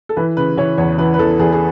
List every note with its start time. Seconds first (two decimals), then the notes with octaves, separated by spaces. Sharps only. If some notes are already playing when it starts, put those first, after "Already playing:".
0.09 A4
0.17 E3 B4
0.37 C#3 B4
0.57 E3 C#5
0.78 E2 C#5
0.98 E3 B4
1.14 B4
1.19 E2 A4
1.39 E2 G#4
1.53 G#4